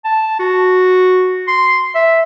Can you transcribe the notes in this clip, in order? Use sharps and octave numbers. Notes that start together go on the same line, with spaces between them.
A5
F#4
C6
E5